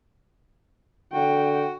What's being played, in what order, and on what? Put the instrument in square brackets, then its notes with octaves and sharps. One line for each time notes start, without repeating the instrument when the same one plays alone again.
[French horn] D3 [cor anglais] F#4 [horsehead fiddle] G5